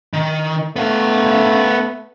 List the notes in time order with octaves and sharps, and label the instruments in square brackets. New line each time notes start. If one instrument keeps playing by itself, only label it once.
[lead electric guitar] D#3
[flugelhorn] A3 [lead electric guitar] B3 F5